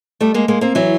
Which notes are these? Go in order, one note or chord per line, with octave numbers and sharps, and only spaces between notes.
G3 A3
G#3 A#3
G#3 A#3
A#3 C4
E3 F#3